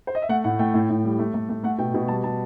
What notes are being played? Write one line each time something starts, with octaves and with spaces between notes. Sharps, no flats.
C5
D#5
E5
A3 F#5
A2 F#5
A3 G5
A2
A2
G3
A3
A3
A3
A3 F#5
B2 G5
B2
G3 A5
G3 A5